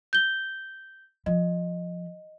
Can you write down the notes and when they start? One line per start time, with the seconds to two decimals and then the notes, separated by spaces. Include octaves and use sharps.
0.13 G6 G7
1.26 F3 D#5